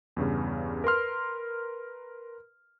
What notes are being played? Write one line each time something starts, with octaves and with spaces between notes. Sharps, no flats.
E2 G2 C#3
A#4 B4 C6 F6